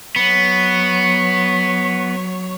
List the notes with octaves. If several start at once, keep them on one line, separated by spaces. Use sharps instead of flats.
F#3 B3 C#5